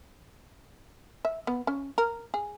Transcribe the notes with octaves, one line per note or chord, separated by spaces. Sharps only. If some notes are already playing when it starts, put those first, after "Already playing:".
E5
B3
C#4
A#4
G#4